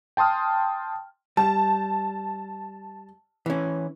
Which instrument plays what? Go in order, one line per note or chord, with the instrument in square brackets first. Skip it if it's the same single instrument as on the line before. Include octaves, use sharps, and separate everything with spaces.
[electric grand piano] G5 A5 C6 D#6 F6
[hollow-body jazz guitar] G3 [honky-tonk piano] A5
[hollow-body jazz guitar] E3 C#4